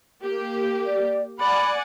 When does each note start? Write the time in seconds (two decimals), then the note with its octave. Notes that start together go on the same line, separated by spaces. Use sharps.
0.22 A#3 G4
0.86 D5
1.40 D5 F#5 G#5 B5